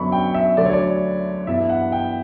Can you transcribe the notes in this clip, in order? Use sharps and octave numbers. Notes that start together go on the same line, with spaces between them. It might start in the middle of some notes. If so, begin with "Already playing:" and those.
Already playing: F#2 D3 F#3 B3 D4 B5 C#6
G5
E5
D2 D3 F#3 A3 D5
C#5
D5
G2 E3 B3 E5
F#5
G5